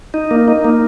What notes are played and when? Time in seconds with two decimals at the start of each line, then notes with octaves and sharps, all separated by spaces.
0.14 D#4
0.31 A#3
0.48 D#4
0.65 A#3